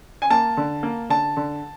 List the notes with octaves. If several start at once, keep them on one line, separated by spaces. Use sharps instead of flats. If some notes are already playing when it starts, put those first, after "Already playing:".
G#5
A#3 A5
D3
A#3
D3 A5
D3